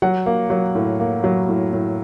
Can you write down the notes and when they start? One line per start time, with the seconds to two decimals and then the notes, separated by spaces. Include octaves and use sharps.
0.02 F#3 F#5
0.26 A#3
0.50 F#3
0.75 A2
1.00 A#3
1.24 F#3
1.49 A2
1.73 A2